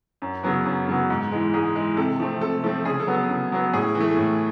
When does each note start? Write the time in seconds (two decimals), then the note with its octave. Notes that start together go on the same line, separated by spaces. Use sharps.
0.22 F#2
0.43 C#3 F#3 B3
0.65 F#2
0.87 C#3 F#3 B3
1.10 G#2
1.32 E3 G#3
1.54 G#2 G#4
1.76 E3 G#3
1.97 C3 A4
2.19 F3 A3 C4
2.41 C3 A4
2.64 F3 A3 C4 A4
2.85 C#3 G#4
3.00 A4
3.07 F#3 B3
3.15 A4
3.29 C#3
3.52 F#3 B3
3.73 A2 G#4
3.95 E3
4.00 A3
4.17 A2